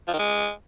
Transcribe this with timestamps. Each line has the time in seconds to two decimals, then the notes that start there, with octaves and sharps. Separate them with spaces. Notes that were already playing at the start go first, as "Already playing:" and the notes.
0.08 F3
0.13 D#3
0.19 G#3